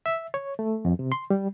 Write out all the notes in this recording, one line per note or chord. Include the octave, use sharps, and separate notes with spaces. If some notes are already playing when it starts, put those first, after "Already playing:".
E5
C#5
A3
F2
C3
C6
G3